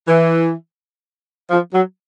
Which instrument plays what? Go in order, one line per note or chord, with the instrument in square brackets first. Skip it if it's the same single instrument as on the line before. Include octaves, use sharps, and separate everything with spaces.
[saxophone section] E3
F3
F#3